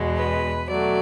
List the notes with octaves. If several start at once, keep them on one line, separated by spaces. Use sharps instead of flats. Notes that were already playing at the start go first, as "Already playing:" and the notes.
Already playing: E2 B2 G#3
B4
B2 F#3 A3 D5